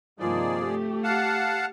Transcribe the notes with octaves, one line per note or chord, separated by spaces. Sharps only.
G2 C3 D#3 F3 A#3 G#4 D5
A3 G4
F5 F#5 A5